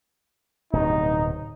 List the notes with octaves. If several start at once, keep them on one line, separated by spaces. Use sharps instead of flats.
D1 G2 B2 D#4